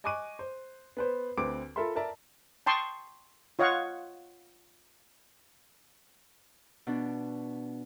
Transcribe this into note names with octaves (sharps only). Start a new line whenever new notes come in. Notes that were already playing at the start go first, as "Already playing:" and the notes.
D#5 G#5 C#6 D6 F#6 D#7
C5
B3 B4 C5
D2 C4 B4 D6 D7
F4 A4 A#4 E5 B5 C6
A#4 D5 E5 A5 A#5
G5 A5 C6 C#6 D#6
F4 C#5 D#5 F5 F#5 C#6
B2 D4